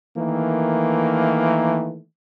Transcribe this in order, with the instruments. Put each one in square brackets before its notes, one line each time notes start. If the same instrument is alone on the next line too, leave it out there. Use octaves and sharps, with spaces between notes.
[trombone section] D#3 E3 A3 A#3